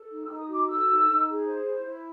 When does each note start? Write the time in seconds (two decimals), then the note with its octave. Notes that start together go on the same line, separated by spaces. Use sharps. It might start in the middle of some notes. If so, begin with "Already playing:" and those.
Already playing: A4
0.10 D#4
0.24 E6
0.28 D#4
0.38 D#6
0.48 F#4
0.53 D6
0.68 A4 E6
0.88 D#4
1.07 D#4
1.27 G#4
1.46 C5
1.66 E4
1.86 E4